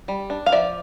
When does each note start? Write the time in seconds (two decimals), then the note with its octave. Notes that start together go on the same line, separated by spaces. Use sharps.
0.08 G3
0.30 D4
0.46 F5
0.52 F3 D5 E5